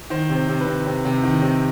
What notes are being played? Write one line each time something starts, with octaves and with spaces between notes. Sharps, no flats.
D#3 C5
C3
C5
C3
B4
C3
C3
C3
D#3
C3